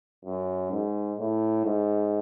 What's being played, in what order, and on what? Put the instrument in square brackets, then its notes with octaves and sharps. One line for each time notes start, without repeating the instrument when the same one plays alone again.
[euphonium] F#2
G#2
A2
G#2